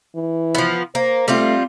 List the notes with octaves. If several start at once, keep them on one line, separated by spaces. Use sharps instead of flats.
E3
F3 B3
A#3 C5
G3 A3 C4 F4